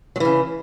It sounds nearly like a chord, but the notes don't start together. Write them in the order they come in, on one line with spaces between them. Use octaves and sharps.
F#3 E3 C#3